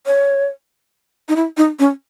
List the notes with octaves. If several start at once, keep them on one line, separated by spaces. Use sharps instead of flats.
C#5
D#4
E4
D#4
C#4